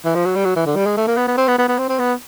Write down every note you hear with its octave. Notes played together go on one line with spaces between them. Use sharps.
E3
F3
F#3
G3
F#3
E3
D3
G3
G#3
A3
A#3
B3
B3
C4
B3
B3
B3
C4
C4
B3